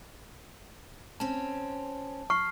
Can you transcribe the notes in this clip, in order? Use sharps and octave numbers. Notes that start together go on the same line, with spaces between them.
C4 C#4 A5
C#6 F6 C7